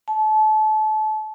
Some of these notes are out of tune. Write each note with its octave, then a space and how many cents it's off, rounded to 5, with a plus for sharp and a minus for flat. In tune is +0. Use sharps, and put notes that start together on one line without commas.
A5 -30